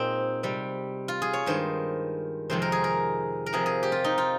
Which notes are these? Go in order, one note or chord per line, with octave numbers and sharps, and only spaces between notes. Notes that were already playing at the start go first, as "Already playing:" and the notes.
Already playing: A#2 G#3 C4 D#4
C3 G3
F4
G#4
C#5
G2 D#3 G#3 C5
F2 C3 D#3 G#3 C5
A#4
G#4
A#4
A#4
F2 C3 F3 G#4
G#4
G4
F4
D#4
F4